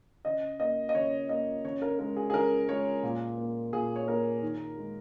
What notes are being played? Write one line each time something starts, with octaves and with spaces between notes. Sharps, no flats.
C#3 D#5
A#3 D#5
D#5
C#3 C#5
A#3 D#5
C#3 C#5
A#4
G#3 A#4
G#4
G#4
C#3 A#4
G#3 C#5
A#2
A#3
A#2 G#4
C#5
A#3 A#4
D#3
G#3